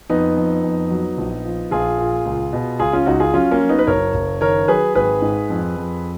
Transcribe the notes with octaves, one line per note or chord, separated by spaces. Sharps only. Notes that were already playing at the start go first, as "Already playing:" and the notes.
F2 B3 D#4
F2
F2
F#3
A#1
F3
A#1 F4 G#4
A#2
C#2
B2
C#2 F4 G#4
C#4 F4
C#2 D#4 F#4
F4 G#4
F#3 C#4 F4
A#3 C#4
F#3
B3 D#4
B4
F#1 A#4 C#5
F#1
D#3 A#4 C#5
F#3 G#4 B4
G#1 G#4 B4
G#2
F2
F2